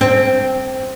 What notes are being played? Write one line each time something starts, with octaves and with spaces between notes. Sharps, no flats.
C4